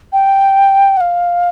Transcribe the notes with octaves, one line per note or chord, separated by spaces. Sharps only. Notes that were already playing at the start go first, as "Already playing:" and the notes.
G5
F#5
F5